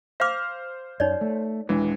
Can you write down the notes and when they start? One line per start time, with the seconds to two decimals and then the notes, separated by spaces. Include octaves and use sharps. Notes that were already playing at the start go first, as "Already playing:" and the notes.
0.20 C5 F5 D6 F6
1.00 F#2 D#4 C#5 D5
1.21 A3
1.69 D#1 E3 G#3 D4